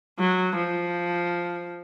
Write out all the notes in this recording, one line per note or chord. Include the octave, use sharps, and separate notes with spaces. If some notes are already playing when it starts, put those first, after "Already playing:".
F#3
F3